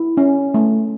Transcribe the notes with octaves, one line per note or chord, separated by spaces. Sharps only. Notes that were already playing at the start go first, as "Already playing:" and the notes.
Already playing: E4
C#4
A3